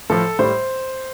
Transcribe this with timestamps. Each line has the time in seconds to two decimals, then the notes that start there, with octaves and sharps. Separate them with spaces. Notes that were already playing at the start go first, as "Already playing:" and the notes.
0.10 A2 F3 A4
0.39 A2 G3 C5